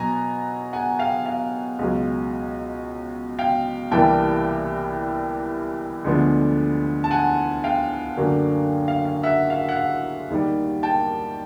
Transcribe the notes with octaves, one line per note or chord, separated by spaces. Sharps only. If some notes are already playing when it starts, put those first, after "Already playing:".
Already playing: B2 F#3 B3 G#5 A#5
F#5 G#5
F5 G5
F5
C#2 B2 F#3
F5 G5
C2 C3 E3 G3 A#3 G5 A5
D2 D3 F3 G#3 B3
A5
F#5 G#5
F5 G5
F#2 D3 F#3 A#3
F5
F5
E5 F#5
F5
F#5
F5
D#2 D#3 G3
G5 A5